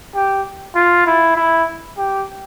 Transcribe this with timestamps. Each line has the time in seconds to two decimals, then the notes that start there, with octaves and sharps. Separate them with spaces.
0.15 G4
0.75 F4
1.06 E4
1.36 E4
1.97 G4